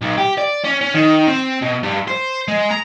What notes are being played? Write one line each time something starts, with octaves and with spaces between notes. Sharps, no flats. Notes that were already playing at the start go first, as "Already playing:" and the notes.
B1
G4
D5
C#4
C#4
D#3
C4
B2
G2
C5
G#3
A#5